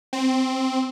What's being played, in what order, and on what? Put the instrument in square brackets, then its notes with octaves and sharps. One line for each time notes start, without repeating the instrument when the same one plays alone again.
[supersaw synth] C4